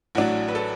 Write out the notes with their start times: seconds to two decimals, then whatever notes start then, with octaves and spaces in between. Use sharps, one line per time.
0.15 A1 A2 F#3 D4 F#4
0.48 B4
0.55 A4